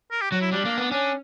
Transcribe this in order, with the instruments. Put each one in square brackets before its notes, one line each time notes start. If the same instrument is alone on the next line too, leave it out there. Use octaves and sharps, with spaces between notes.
[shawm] A#4
G4
[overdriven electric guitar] F#3 [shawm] F#4
[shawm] E4
[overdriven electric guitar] G3 [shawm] D4
[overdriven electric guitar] A#3
B3
[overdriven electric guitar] C#4 [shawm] D4